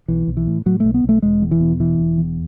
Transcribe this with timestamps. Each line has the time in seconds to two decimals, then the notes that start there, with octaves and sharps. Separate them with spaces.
0.08 B1 E3
0.28 B1
0.37 E3
0.47 A2
0.66 A2 F#3
0.80 B1 A3
0.94 B3
1.04 B1 A3
1.22 E1 G#3
1.42 E2
1.51 E3
1.60 B2
1.80 E1 E3
1.99 E1
2.18 E2